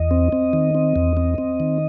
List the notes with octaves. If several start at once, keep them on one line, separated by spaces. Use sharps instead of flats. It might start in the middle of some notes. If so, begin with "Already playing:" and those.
Already playing: E2 D#5
C4
C4
D#3
C4
E2
C4
C4
D#3